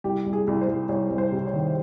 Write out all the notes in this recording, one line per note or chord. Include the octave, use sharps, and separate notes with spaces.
C2 G4
C2
G#4
C2
C5
C2
C2 C#5
C2
C5
C3
C#5
D#3